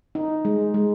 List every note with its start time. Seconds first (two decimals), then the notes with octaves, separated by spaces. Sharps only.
0.15 D#4
0.45 G#3
0.74 G#3